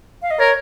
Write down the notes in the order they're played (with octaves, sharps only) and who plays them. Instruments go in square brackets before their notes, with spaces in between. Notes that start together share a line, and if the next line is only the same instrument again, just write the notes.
[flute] F5
D#5
[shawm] A#4 [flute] C#5